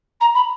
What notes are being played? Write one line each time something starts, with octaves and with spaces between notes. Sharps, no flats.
A#5
B5